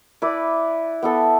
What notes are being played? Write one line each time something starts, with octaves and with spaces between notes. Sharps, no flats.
E4 B4 D5
B3 E4 A4